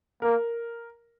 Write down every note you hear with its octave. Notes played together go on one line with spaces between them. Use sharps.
A#3 A#4